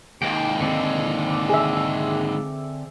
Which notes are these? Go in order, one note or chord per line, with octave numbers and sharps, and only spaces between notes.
D#2 G#2 G5
D3 C4 A4
G#4 E5